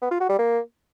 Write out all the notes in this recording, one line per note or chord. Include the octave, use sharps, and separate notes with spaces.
B3
F4
F#4
G3
A#3